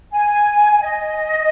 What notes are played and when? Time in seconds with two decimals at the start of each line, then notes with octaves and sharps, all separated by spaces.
0.12 G#5
0.81 D#5